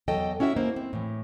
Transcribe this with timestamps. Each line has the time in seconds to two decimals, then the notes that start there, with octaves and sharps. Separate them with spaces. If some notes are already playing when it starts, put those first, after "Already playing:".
0.08 E2 F#3 A4 D#5 G5
0.40 C#4 E4 F#4 E5
0.56 A#3 E4 C5 D#5
0.76 C4
0.93 A2 E3